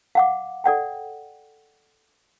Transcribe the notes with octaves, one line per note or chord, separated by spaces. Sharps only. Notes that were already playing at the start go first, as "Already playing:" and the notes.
F5 F#5 D6
A4 D5 F#5 G5